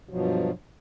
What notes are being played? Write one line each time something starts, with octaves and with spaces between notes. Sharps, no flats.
G2 B2 F3 F#3